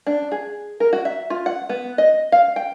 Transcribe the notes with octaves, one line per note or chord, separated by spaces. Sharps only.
D4
G#4
A#4
F#4
E5
F4
F#5
B3
D#5
F5
G5